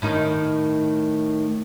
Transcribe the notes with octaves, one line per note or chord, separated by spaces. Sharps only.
A2 D#3 D#4